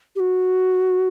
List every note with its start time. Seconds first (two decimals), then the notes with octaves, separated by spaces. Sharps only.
0.16 G4
0.20 F#4